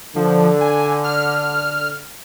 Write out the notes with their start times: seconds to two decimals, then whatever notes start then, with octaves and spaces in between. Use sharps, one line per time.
0.16 D3 F3
0.61 G#5
1.04 F6